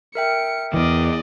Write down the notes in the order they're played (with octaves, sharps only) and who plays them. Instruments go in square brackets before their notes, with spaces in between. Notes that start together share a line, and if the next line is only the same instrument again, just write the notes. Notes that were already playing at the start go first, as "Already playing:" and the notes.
[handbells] A#4 E5 G5 [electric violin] C#7
[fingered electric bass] E2 E3 [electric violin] D5 D#5